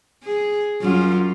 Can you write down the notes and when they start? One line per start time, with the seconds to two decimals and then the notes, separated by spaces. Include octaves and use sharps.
0.23 G#4
0.81 F#2 F#3 F4